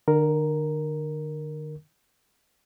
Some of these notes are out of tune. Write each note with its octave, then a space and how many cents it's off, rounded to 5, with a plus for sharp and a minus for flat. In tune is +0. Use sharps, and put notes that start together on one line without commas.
D3 +40 A#4 +0